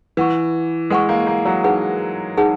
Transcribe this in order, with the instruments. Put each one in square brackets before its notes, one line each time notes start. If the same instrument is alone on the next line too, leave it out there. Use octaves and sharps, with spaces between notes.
[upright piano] E3 [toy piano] B4 F#5 C#6
[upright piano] G#3 [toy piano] B4 F#5 C#6
[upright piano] A#3
A#3
F#3
[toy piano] D#4 G#4 B4 F#5
D#4 G#4 B4 F#5